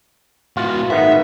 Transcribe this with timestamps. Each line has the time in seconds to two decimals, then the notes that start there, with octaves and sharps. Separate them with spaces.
0.57 A2 F4 F#4
0.90 G#2 D#3 B3 E5